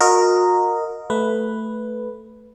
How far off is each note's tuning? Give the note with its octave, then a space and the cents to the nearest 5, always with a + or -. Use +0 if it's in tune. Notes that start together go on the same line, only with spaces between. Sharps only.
F#4 -40 A#4 -10 D#5 +0
A3 +0 B4 +0